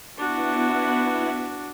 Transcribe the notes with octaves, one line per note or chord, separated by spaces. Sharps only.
B3 D4 E4 F#4